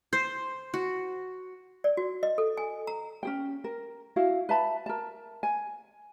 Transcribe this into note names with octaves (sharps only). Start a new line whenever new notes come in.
C5
F#4
D5
F#4
D#5
A4
G#5
A#5
C#4 G#4 G5
A#4
E4 F#4 F5
B4 E5 A5 B5
A#4 A5
G#5